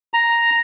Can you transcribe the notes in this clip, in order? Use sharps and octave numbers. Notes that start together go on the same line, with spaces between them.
A#5